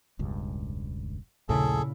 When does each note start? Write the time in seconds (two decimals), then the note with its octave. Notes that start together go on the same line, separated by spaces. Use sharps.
0.19 E1 C#2 G2
1.49 A#1 D#2 A#2 C#3 A3 E4 G#4 A4